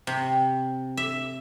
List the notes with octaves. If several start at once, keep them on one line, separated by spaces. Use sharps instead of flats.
C3
E5